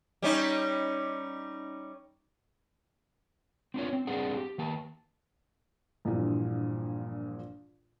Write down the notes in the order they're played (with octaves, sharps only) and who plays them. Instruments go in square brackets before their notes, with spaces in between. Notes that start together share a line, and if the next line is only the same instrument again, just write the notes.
[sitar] G3 C#4 D#4
[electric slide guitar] C4 D4 F4 C#5
C4
G3 C4 D4 G#4 F#5
G4
D#3 A#3 A5
[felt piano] A#1 G2 A#2 E3